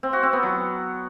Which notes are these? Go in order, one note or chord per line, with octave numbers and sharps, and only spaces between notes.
C4
F#4
C4
B3
F#3